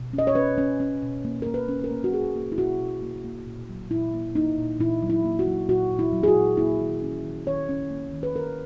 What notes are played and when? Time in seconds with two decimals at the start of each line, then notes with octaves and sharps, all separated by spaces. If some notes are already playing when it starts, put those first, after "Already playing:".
Already playing: B2
0.13 C#4
0.18 D#5
0.27 C#5
0.35 C#4 B4
0.58 C#4
0.80 C#4
1.02 B2
1.25 A#3
1.42 A#3 A#4
1.54 B4
1.69 C#4
1.84 A#4
1.91 A#3
2.04 F#4
2.13 A#3 G#4
2.36 A#3
2.52 E4
2.58 B2 F#4
2.80 B2
3.02 A#3
3.24 A#3
3.47 A#2
3.69 F#3
3.91 A#2 E4
4.14 A#3
4.35 A#3 D#4
4.58 A#2
4.80 A#2 E4
5.02 F#3
5.10 E4
5.25 A#3
5.39 F#4
5.47 F#3
5.69 A#2 F#4
5.91 A#2
5.99 E4
6.13 F#3
6.23 G#4
6.28 F#4
6.36 A#2
6.57 A#3 E4
6.80 D#3
7.02 C#4
7.24 D#3
7.47 D#3 C#5
7.69 C#4
7.91 A#3
8.13 D#3
8.23 B4
8.36 D#3 A#4